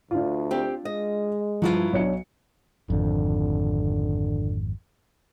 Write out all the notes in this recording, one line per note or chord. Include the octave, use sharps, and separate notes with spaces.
D2 D4 F4
C4 G4
G#3 D#5
G2 F3 F#3 E4 F4
B1 D4 C#5 C#7
G#1 F2 D3